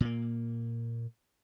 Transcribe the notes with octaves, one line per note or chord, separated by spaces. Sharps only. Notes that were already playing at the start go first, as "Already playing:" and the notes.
A#2 A#3